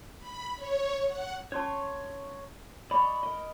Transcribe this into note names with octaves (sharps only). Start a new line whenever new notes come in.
B5
C#5
F#5
C#4 C#5 A5 C6 C#6
D5 D#5 B5 C#6 D6
A#4 D#5